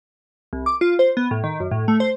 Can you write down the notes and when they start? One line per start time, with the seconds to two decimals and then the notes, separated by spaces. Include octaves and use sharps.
0.53 C2
0.66 D6
0.81 F4
0.99 C5
1.17 B3
1.31 A2
1.44 D#3
1.60 F#2
1.71 A2
1.88 A3
2.00 C5